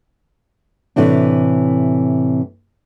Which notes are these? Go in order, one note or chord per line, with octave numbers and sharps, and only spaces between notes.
A2 C3 E3 D4